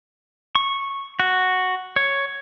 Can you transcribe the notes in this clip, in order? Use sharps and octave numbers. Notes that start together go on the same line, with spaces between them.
C#6
F#4
C#5